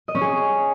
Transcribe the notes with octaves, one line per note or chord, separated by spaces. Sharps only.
D#5
C#4
G#4